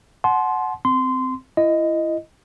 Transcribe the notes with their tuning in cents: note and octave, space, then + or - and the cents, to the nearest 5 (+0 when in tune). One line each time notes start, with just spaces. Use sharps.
F#5 +0 A5 -40 C6 +0
C4 -15 C6 -20
E4 +30 D#5 +0